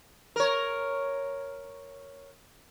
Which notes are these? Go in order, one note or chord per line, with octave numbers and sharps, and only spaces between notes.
A#4 C#5